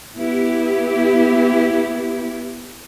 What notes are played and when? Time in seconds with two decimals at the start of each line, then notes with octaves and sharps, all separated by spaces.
0.17 B3 E4 G4